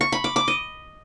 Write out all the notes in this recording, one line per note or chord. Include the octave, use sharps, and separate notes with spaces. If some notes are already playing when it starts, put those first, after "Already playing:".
C#6
B5
D6
D6
D#5